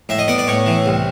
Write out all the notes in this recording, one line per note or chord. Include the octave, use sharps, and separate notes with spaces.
A2 E5
D#5
B3 D5
D5
A2 C#5
E3
C2